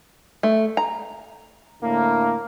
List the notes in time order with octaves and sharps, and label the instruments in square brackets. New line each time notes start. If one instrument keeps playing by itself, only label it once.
[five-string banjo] A3
A#5
[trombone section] A2 D3 A#3